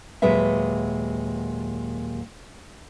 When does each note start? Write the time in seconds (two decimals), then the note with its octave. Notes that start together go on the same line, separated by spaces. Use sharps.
0.22 D#2 A#2 F#3 G#3 B4 E5